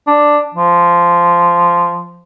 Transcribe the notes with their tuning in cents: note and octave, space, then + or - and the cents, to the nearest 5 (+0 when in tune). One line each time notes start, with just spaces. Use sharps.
D4 +5
F3 -10